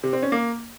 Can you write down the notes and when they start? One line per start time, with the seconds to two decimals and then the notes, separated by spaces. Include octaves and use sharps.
0.03 C3
0.13 C4
0.22 C#4
0.32 A#3